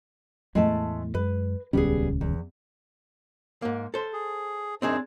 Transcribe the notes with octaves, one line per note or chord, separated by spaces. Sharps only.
E2 A2 G#3 A3 A5
F#2 G#3 B4
D#1 C#2 G3 B3 C#4 G#4
E2
G#2 A#3
A4 C5
G#4
F#2 C4 D4 D#4 G#4